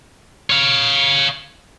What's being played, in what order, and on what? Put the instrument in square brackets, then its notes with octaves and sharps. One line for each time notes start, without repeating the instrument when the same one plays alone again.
[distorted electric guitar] C#5 F5